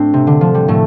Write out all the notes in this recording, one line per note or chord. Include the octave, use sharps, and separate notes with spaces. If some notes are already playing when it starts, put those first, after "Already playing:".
Already playing: A2 A3 C4 D4
C3
D3
F3
G3
A2 A3